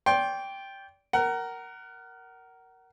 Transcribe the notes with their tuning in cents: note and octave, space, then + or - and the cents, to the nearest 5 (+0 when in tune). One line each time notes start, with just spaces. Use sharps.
D5 -35 G5 +0 C6 +20
A#4 +0 F#5 +30